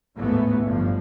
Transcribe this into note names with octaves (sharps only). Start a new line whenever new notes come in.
A1 D#2 G#2 E3 A3 B3
G1 G2 F3